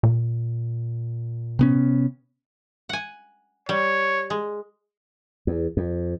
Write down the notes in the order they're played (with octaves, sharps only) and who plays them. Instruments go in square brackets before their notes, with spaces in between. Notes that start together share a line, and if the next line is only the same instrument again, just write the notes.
[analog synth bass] A#2
[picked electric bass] C3 B3 C#4
[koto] F#5 G#5
[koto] G3 [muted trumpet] C#5
[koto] G#3
[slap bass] E2
F2